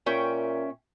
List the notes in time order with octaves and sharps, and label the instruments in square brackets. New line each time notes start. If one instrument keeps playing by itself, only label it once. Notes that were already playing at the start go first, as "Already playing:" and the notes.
[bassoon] A#2 [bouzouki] C#4 E5 G5